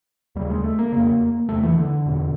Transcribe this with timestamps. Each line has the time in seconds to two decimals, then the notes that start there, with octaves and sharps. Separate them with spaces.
0.35 D#2 C#3 G3
0.50 G#3
0.64 A3
0.79 A#3
0.92 F2 C#3
1.49 E2 C3 A3
1.63 E3
1.78 D3
2.06 E2 B2